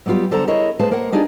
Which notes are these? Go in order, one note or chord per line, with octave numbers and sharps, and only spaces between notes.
F#3 G3 B3 F4 G4
D3 A4 C5 F#5 A#5
E4 G#4 A#4 C#5 D#5 E5
A3 G#4 B4 C5 F5 A5
A#3 A#4 C5 F#5
D4 D#4 F4 G4 G#4 D5